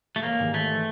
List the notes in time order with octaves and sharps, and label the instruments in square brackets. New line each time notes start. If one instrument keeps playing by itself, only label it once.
[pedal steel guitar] A3
[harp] A1 [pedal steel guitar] A#3
[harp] G#2 D#3 G3
[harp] G#1 [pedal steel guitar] A3
[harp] E3